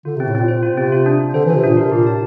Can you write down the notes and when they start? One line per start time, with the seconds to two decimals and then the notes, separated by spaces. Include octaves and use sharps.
0.05 D3 F4
0.17 C3
0.20 C4
0.27 A2
0.35 A#2 C4
0.48 A#2 C5
0.63 F4
0.70 C3
0.78 C4
0.92 F4
1.06 D4
1.21 D4
1.34 D3 C5
1.46 E3
1.50 F4
1.56 C3
1.64 A#2 D4
1.77 C3 A#4
1.92 A#2 G4
2.06 A2 A5